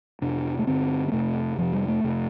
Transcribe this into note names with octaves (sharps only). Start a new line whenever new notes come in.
F2 C3 D4
A3
G2 D3 C4
C4
F2 C3 A3
F2 C3 F3
G3
A3
F2 C3